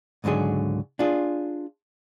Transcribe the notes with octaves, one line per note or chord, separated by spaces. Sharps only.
C#2 G#2 D3 F#3 G#4
D4 F4 G#4